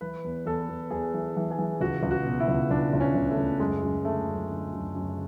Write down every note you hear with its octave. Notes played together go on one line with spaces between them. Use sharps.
E3 B4
E2
E2 A4
E2
E2 G#4
E3
E3
G#4
E3
C#2 F#4
C#2
F#4
B2
E4
C#2
C#2 D4
C#2
C#4
C#2
A3
C#2
F#2 G#3
F#2
D3 A3
F#2
D3
F#2
F#2